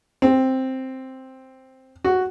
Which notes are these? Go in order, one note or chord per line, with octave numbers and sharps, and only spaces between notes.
C4
F#4